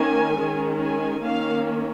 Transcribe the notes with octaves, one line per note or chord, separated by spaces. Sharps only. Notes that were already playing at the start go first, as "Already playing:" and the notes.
Already playing: D#3 A#3 C#4 G#5
D#3 G#3 C#4
G#5
D#3 A#3 C#4 F5